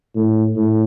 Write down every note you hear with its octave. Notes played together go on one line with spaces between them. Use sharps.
A2
A2